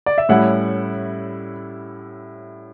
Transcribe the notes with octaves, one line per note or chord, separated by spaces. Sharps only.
D5
E5
A2 G3 C#4 E4 F#5